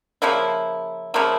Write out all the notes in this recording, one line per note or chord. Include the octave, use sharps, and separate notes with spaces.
C#3 F3 A#3 E4
C#3 F3 A#3 E4